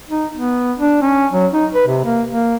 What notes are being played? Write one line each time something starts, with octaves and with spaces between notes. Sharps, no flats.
D#4
B3
D4
C#4
F#3
D#4
B4
C3
A#3
A#3